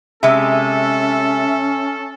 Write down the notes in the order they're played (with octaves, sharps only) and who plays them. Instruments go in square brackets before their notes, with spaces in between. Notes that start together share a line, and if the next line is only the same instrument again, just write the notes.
[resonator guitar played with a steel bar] C3 G#3 [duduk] C#4 [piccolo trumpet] A4 [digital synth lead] E5